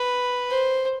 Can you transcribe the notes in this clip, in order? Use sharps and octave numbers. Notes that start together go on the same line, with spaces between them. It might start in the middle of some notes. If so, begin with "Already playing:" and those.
Already playing: B4
C5